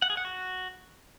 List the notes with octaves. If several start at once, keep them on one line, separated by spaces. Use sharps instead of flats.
F#5
G#4
F#5
F#4